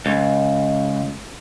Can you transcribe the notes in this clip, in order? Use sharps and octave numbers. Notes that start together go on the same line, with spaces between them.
C#2